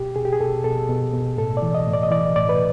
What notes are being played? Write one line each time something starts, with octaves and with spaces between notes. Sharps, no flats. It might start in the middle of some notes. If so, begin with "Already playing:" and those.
Already playing: B2 G4
B2 G#4
G4
G#4
B2 A4
B2 A4
B2
B2
A2 A4
D5
E3
D#5
A2
D5
D#5
E3 D5
A2 D5
B4